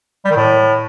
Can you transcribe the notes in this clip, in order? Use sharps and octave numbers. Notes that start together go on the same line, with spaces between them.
G3
D#3
A2